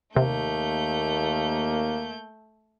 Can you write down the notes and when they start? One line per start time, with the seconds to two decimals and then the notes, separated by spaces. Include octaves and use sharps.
0.16 D#2 C3 A3 A#3 G6